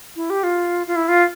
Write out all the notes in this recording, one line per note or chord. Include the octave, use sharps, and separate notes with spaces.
E4
G4
F4
F4
E4
F4